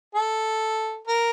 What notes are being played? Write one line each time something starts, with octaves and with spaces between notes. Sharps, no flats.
A4
A#4